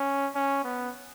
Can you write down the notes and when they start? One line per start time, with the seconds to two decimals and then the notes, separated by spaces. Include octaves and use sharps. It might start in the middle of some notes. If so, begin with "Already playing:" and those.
Already playing: C#4
0.35 C#4
0.64 B3